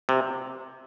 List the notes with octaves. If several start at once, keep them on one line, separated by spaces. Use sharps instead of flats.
C3